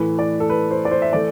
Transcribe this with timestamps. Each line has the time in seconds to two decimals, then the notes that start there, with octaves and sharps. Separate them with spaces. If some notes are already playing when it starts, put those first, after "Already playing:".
Already playing: A2 E3 A3 B4
0.19 D5
0.40 A4
0.50 B4
0.71 C5
0.85 D5
0.91 C5
1.02 E5
1.13 E3 A3 D5